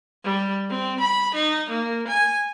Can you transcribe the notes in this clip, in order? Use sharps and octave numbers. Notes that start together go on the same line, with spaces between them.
G3
C4
B5
D#4
A#3
G#5